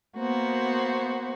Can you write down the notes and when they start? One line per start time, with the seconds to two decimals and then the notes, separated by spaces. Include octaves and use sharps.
0.17 A#3 B3 F#4 C5